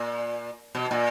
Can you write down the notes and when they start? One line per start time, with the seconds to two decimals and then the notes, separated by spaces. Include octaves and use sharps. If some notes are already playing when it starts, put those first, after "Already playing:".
Already playing: A#2
0.75 B2
0.91 A#2